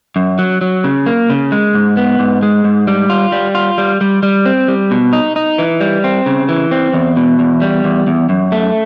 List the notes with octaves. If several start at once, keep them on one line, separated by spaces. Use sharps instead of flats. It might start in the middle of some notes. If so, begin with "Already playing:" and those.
F#2
F#3
F#3
C#3
A#3
C#3
G#3
G#2
B3
G#2
G#3
G#2
G3
F4
G3
F4
G3
G3
G3
C4
G3
B2
D#4
D#4
E3
G3
C4
C#3
E3
C4
E2
B2
E2
G3
E2
E2
F#2
A3